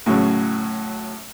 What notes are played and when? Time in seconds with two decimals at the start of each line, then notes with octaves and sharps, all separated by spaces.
0.06 A2 C#3 F#3